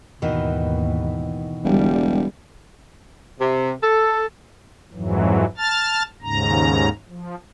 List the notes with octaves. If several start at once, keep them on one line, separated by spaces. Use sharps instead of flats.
D#2 G#2 B2 D#3 E3
E1 D3 G3
C3
A4
F2 G#2 E3 F#3
A5 F6 A6
D#2 G#2 C#3 A#5
F3